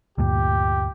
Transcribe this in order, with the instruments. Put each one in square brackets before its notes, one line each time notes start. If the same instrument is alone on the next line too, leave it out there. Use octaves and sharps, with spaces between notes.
[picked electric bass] D2 G2 A#2 [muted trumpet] G4